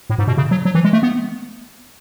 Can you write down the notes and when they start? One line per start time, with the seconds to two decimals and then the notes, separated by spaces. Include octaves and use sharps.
0.10 A2
0.19 G#2
0.27 B2
0.37 C#3
0.51 F#3
0.65 F#3
0.75 E3
0.84 G#3
0.93 A3
1.03 B3